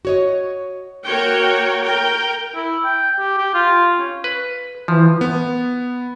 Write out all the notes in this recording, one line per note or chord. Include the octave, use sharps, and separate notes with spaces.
F#4 C#5 D#5
A#3 F#4 A#4 C#5 G5
A#4 G5
E4
G5
G4
G4
F4
C#4
B4
E3 F3
B3